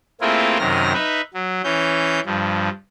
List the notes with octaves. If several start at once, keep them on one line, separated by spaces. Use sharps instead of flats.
A3 A#3 C4 E4 F4 G#4
F#2 C3 D#3 F6 A#6
D#4 B4 E5
F#3
E3 C#4 G6
G2 F3